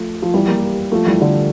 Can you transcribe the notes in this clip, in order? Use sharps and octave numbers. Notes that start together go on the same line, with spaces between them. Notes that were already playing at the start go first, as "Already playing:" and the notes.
Already playing: F3 A3
F3
E3 G3
G3 A#3
F3 A3
E3 G3
D3 F3